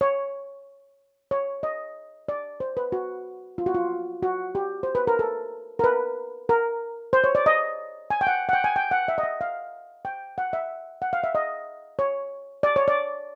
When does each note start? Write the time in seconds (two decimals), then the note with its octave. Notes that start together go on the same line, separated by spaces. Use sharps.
0.01 C#5
1.31 C#5
1.63 D#5
2.29 D5
2.60 C5
2.77 B4
2.92 F#4
3.58 F4
3.66 F#4
3.74 F4
4.23 F#4
4.55 G4
4.83 C5
4.95 B4
5.07 A#4
5.19 A4
5.79 A#4
5.84 B4
6.49 A#4
7.13 C5
7.24 C#5
7.35 D5
7.46 D#5
8.10 G#5
8.21 G5
8.27 F#5
8.49 F#5
8.53 G5
8.64 G#5
8.76 G5
8.91 F#5
9.08 E5
9.18 D#5
9.23 E5
9.41 F5
10.05 G5
10.38 F#5
10.53 E5
11.02 F#5
11.13 F5
11.24 E5
11.35 D#5
11.99 C#5
12.63 D5
12.76 C#5
12.88 D5